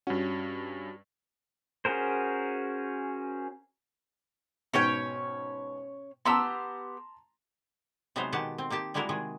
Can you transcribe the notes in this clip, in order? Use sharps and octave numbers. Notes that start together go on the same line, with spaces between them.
G2 C#4 F#4
C#4 F#4 G#4 A#4 C5
G#2 B2 C#4 C#5 G5
B3 G4 A5 A#5 C6 E6
C3 F#3 G#3 B3 D#4 C5
B2 D#3 G#3 G4 F#5 A5
C4
A#3 D#4 G4 A5
G3 G#3 A#3 E4 F#4 A#4
C3 D#3 G#3 G#4